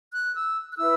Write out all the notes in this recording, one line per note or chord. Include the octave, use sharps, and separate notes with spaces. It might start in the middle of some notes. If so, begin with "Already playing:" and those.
F#6
E6
F#6
E4 B4 E6